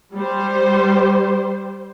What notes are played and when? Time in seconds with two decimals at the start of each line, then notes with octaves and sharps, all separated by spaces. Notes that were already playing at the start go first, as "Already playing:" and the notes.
0.14 G3 C5